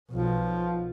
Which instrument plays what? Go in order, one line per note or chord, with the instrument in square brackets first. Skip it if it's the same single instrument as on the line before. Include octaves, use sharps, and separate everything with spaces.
[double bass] B1 B2 [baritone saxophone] F3